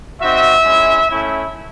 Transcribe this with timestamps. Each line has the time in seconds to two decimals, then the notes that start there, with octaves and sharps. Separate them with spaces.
0.20 C4 D#4 F#4 E5
0.65 G#3 C#4 E4
1.09 A3 C#4 E4